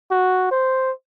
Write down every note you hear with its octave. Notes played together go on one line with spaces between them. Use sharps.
F#4
C5